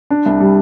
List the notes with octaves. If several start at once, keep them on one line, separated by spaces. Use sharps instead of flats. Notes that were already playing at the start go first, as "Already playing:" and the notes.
D4
C2
G3